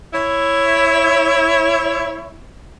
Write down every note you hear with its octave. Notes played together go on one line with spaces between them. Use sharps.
E4 C#5